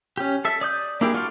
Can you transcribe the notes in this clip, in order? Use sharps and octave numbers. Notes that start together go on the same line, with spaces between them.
C#4 G4
A4 E5
D5 D#6 G6
A#3 D4 E4 G4 G#4
F4 F#4 A4 D5 F5